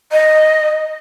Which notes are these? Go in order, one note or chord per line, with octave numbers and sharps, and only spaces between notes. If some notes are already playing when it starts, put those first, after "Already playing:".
D#5